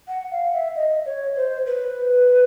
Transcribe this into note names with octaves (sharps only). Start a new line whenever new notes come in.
F#5
F5
E5
D#5
C#5
C5
B4